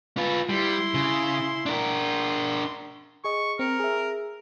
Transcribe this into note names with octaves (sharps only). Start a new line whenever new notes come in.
F4 B4
G3 E4 C6
C#3
D4 A#4
C6
G#4 D#5 C#6
C4 A#4 C#7
G#4 E5